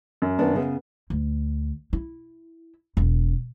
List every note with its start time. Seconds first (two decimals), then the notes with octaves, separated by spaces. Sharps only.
0.22 F#2
0.39 D#3 B3 D4
0.55 C#3 B3
1.10 D2
1.93 E4
2.97 E1